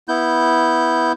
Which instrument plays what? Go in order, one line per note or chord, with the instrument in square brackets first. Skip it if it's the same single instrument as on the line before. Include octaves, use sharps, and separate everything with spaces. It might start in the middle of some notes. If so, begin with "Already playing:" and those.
[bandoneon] B3 E4 G6